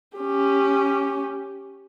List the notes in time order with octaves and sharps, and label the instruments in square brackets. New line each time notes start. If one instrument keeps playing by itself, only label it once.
[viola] C#4 G4